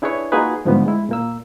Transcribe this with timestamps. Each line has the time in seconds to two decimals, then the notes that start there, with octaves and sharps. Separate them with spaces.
0.02 D4 E4 G#4 B4 C#5
0.32 A#3 D#4 F4 F#4 G#4 B4
0.65 G#2 D3 F3 G3 A3 B3
0.85 G#3 E4
1.09 A#2 A#3 E6